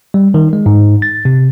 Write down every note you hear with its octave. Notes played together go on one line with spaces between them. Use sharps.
G3
D#3
G#3
G#2
A6
C3